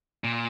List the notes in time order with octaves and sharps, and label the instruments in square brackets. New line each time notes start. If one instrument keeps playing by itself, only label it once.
[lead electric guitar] A#2